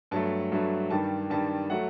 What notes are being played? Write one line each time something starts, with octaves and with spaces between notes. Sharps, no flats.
G2 F#3 A3 A5
G2 F#3 A3
G2 D#3 G3 A5
G2 D#3 G3 A5
F#3 A3 F#5